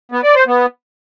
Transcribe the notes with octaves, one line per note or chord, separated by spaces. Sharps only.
B3
D5
C5
B3